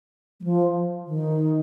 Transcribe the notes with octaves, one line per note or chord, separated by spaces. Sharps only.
G3
F3
D#3